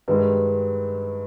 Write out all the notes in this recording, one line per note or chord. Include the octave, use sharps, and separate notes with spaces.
G2 D#3 G#3 B4